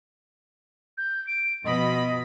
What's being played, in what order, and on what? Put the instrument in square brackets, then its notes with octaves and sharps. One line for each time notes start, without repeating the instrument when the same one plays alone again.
[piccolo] G6
D7
[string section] B2 F3 B5 [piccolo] D#5